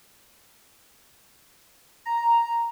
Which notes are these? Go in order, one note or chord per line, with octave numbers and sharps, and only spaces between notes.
A#5